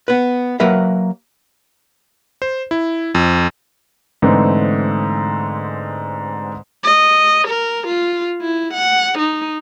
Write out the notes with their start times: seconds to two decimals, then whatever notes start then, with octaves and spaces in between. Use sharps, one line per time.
0.08 B3 B4
0.60 F#3 A#3 A#4 B4 E5
2.42 C5
2.71 E4
3.15 F2
4.22 G#2 D3 E3 A3 C4 D#4
6.84 D#5
7.48 A#4
7.87 F4
8.41 E4
8.74 F#5
9.19 D#4